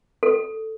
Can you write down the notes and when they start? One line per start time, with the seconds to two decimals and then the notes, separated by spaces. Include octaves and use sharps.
0.23 A4